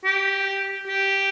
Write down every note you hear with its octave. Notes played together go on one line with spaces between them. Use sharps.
G4
G4